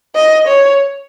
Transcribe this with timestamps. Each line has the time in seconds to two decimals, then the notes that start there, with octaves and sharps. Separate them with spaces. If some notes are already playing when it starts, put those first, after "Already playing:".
0.15 D#5
0.47 C#5